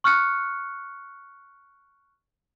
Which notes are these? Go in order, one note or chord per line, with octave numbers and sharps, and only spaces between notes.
C#6 F6 F#6 C#7